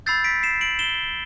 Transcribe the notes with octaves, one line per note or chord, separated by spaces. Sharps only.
B5 E6 G6 A6 C7
B6 D7
C7 E7
D7 F#7
E7 G7